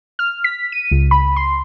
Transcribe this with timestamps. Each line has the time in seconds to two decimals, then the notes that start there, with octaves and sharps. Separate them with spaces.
0.19 F6
0.44 B6
0.72 D#7
0.91 C#2
1.11 B5
1.36 C6